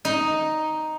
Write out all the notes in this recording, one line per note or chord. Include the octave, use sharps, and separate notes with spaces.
D#4